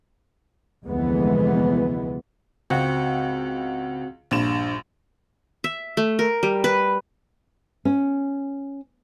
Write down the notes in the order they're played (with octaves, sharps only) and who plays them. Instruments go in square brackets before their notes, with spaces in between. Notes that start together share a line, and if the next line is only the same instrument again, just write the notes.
[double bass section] F1 D2 E3 G#3 B3
[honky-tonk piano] C#2 [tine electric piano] C4 F#4 F#5
[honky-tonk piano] A#1 G2 E7
[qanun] E5
A3
A#4
G3
B4
[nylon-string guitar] C#4